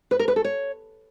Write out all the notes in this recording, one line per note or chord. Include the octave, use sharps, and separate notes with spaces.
B4
A#4
B4
A4
C#5